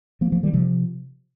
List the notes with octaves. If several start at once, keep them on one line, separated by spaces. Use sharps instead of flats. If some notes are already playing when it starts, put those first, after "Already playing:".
F3 A#3
F3 A#3
D#3 G3
C3 F3